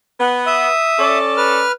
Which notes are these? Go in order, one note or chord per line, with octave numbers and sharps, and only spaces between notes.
B3
E5 D#6
C#4 A4 D5
B4 F6